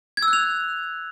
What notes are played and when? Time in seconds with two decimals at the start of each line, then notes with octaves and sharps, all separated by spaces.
0.17 G#6
0.23 E6
0.28 F#6
0.33 F7